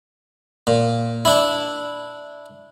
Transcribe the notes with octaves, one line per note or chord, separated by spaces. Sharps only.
A#2
D4 E4